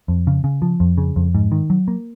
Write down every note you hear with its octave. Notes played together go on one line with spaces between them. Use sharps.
F2
C#3
C#3
F3
F2
C#3
F2
G#2
D#3
F#3
A#3